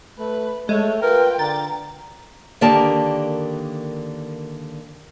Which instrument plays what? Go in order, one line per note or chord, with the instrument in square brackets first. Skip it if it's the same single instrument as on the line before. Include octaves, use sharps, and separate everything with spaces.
[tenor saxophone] A3 [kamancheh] B4
[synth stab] G#3 [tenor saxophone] A3 [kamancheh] A4 C#5
[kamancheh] F4 G5 [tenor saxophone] A#4 [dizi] B4
[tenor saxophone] D3 [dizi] A#5 [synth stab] A6
[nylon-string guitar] D3 D#3 A#3 G4 D5 A5